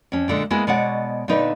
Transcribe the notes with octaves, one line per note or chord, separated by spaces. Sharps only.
F2 C#4
A#2 D3 G#3
G#3 A#3 B3 E4 G#4
B2 G#3 C#5 D5 F#5
A#2 D3 B3 D#4 B4